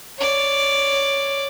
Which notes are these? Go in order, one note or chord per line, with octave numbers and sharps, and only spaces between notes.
C#5 D5